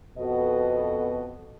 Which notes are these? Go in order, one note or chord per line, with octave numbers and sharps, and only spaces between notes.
F2 B2 B3 F#4 A4 D#5